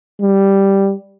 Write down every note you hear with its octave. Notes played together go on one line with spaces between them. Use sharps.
G3